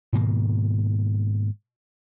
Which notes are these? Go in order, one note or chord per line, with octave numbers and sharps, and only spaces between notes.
G#2 B2 D#3 A#3